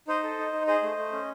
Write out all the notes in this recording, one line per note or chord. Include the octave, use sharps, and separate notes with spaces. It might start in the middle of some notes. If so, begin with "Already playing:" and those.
D#4 C5 D#5
A4
D#4
D#4
G#4 C5 D#5
A3
A3
C#4